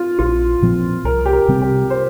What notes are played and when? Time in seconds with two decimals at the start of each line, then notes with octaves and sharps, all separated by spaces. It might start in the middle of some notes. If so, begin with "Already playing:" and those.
Already playing: F4
0.19 A#1 F4
0.62 A#2 F3 C4
1.04 C2 A#4
1.26 G4
1.33 A#4
1.48 C3 G3 C4
1.62 G4
1.90 C5